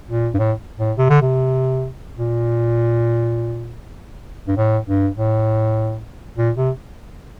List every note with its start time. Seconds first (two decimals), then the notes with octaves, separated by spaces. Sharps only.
0.08 A#2
0.34 G2
0.39 A2
0.78 A2
0.98 C3
1.10 D3
1.22 C3
2.17 A#2
4.48 G2
4.57 A2
4.87 G2
5.17 A2
6.37 A#2
6.56 C3